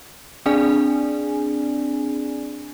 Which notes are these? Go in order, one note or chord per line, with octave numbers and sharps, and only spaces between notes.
C4 D4 G#4 D5 G#5